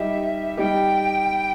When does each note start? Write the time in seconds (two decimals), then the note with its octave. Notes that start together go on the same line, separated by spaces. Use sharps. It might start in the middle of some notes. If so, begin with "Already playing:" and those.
Already playing: G3 D#4 G4 E5
0.57 G3 D#4 G4 G5